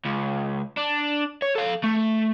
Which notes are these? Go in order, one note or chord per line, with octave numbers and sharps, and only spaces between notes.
C#2
D4
C#5
A4 F5
A3